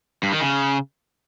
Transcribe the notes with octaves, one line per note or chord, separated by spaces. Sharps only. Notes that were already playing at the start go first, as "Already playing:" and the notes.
G2
D#3
C#3